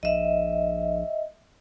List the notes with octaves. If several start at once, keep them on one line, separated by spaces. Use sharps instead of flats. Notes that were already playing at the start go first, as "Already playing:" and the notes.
A#1 D#5 E5